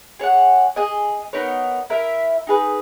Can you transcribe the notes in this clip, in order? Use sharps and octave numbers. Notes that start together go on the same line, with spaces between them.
G#4 C#5 F#5
G#4 D#5 G#5
B3 D#4 A#4 C#5
E4 A#4 E5
D#4 G#4 B4